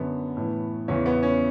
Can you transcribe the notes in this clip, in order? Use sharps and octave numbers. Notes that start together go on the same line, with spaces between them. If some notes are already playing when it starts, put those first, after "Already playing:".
Already playing: F#2 D3 B3
A2 E3
E2 C#3 E3 C#4
B3
C#4